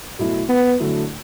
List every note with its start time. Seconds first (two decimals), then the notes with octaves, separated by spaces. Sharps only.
0.19 B2 F#3 A3 E4
0.49 B3
0.80 D3 F#3 A3 E4